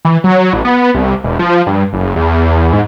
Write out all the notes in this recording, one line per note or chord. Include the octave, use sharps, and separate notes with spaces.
E3
F#3
A1
B3
C2
E1
F3
G2
F#1
E2
G#2